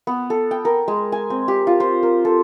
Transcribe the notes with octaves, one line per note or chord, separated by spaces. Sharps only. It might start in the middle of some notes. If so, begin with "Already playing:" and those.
B3
A4
G5
A#4
G#3
G#5
C4
G4
F4
C5
A#4
A4